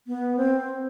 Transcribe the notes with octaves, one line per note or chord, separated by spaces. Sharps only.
B3
C4